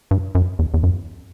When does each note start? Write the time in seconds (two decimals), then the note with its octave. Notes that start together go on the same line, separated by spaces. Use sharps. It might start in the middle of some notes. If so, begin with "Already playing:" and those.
0.11 G2
0.35 F#2
0.59 E2
0.74 E2
0.83 F#2